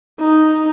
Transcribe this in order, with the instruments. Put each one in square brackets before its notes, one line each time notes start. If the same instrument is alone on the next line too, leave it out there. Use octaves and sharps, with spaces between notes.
[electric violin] D#4